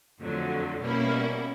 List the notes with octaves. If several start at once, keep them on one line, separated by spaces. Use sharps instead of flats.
F2 D3 F#3 A3
B2 G3 A#3 C#4 E4